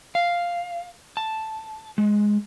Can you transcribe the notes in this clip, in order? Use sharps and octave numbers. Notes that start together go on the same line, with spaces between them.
F5
A5
G#3